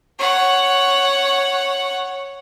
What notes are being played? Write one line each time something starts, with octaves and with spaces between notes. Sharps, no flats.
C#5 F#5